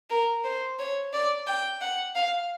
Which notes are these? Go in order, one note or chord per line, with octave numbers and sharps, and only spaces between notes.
A#4
C5
C#5
D5
G5
F#5
F5